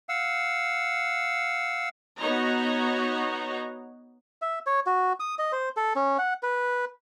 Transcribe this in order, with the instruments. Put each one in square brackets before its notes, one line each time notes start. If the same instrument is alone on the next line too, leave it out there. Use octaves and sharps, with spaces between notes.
[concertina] F5 F#5 E6
[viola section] B3 D#4 F#4 C#5 D#5 A#5
[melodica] E5
C#5
F#4
D#6
D#5
C5
A4
C#4
F#5
B4